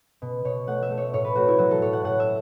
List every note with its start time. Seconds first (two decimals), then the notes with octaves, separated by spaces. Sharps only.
0.22 B2
0.44 B2 C#5
0.67 A3 F#5
0.82 E5
0.90 A3
0.98 C#5
1.13 A2 C#5
1.24 B4
1.35 A3 F#4
1.48 E4
1.58 F#3 F#4
1.71 A4
1.82 A2 C#5
1.93 F#5
2.04 A2 F#5
2.20 E5